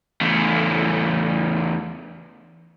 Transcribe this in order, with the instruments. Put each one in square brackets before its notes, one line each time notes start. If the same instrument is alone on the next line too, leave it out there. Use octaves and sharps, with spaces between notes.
[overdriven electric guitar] E2 A3